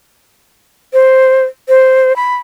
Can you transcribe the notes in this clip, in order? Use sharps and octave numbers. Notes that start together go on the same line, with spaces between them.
C5
C5
B5